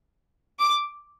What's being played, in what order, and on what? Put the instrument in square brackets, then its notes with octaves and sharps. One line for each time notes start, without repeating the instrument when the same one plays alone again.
[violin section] D6